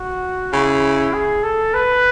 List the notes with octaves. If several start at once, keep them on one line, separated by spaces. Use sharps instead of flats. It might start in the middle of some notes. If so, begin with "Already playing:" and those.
Already playing: F#4
C#3 E4
G#4
A4
B4